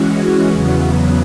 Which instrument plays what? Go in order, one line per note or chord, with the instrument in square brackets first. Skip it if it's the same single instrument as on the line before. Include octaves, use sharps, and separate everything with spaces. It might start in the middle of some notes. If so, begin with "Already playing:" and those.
Already playing: [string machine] E3 G#3 C#4 F#4
E2 C#3 F#3 B3